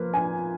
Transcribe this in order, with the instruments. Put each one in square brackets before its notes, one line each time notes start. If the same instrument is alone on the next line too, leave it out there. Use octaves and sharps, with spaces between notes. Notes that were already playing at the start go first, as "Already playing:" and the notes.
Already playing: [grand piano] F3 A#3 F4 [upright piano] B4
[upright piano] G#5